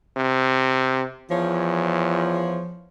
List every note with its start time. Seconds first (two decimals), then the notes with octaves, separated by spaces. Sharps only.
0.17 C3
1.30 E2 F3 C#5